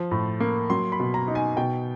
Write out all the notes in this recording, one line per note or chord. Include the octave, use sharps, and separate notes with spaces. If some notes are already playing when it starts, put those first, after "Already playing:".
Already playing: F3
A2
A#3
F#3 C6
B5
B2
A#5
D#4
G#5
B2 G5